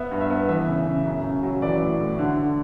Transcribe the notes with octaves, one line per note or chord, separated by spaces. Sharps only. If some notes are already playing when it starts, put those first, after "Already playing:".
Already playing: B3 E5
G2
E5
B3
E3 E5
C#3
C#3
F#2
C#3
F#3
E3 D5
A2
A2
D3
D3